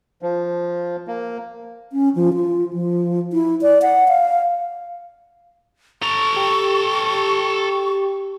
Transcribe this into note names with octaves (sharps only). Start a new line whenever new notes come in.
F3
A#3
C#4
F3
F4
F3
E4
D5
F#5
F5
A4 A#5 C#6
G4